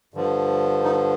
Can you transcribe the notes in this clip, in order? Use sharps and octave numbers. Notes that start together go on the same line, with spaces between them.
G2 D3 F3
D#4